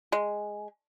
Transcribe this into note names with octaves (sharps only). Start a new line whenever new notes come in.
G#3